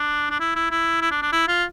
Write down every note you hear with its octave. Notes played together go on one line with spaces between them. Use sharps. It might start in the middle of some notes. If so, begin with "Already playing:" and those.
Already playing: D4
D4
E4
E4
E4
E4
D4
D4
E4
F4